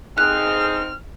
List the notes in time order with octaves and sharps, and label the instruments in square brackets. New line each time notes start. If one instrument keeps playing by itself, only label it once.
[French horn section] C4 D#4 [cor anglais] G#4 [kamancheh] F6 [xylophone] F#6